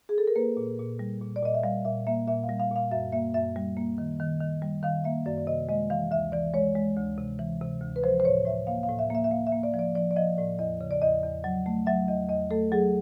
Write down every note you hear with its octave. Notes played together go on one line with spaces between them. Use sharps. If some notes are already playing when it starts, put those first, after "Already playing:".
G#4
A4
A#4
A#3 B4
A#2
A#2
G3
A#2
D5
A#2 D#5
E5
G3 F5
A#2 E5
A#3 E5
A#2 E5
F5
G3
F5
A#2 F5
F#2 E5
A#3 E5
F#2 E5
G3
A#3
D#3
D#3
D#3
G3
D#3 F5
A#3 E5
F#2 D5
D5
C3 D#5
G#3 D#5
E3 F5
D2 E5
E3 D5
G#3 C#5
G#3
D2
C3
E3
C3
D2
B4
F3 C5
C5
A2 C#5
A2 E5
A#3 F5
F5
A2
E5
A#3 E5
E5
A#3 F5
E5
A#3
D5
F3
D5
F3 D5
D5
F3 D#5
A2 D5
E2 D#5
C#3
D5
E2 D#5
E2
F#3
A3
F#3 E5
E2 D#5
E2 D#5
A3 A4
F#3 G#4